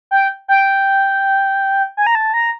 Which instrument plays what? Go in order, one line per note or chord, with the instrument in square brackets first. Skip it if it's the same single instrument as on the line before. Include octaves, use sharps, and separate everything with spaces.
[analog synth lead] G5
G5
G#5
A#5
A5
A#5